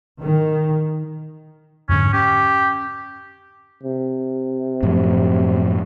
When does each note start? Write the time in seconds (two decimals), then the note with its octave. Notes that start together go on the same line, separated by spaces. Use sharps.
0.21 D#3
1.89 F2 G#2 D3 C#4
2.13 C#4 G4
3.83 C3
4.83 F#2 A2 F3